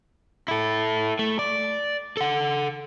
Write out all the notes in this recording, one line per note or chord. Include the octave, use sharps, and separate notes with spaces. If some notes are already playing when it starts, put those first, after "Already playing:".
E4 A4
A3
D5
A4 F#5